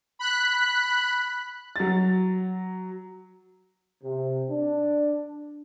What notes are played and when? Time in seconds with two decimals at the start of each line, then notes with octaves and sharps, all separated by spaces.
0.19 B5 F#6
1.76 F#3 A6
4.04 C3
4.51 D4